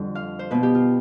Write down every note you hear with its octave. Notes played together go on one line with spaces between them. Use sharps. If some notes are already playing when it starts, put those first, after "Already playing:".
Already playing: F2 D3 G3
F5
C5
B2 B3 B4
G4
F4